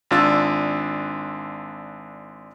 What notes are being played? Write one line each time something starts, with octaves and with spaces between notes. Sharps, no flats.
G#1 D4 F4 E6 A6